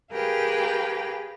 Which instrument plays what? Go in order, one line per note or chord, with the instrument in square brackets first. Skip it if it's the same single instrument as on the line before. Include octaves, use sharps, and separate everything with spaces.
[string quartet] G4 G#4 A#4 B4 F5 G5